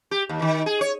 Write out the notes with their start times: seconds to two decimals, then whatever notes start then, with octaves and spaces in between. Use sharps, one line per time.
0.11 G4
0.29 D#2
0.42 D#3
0.66 G#4
0.81 C#5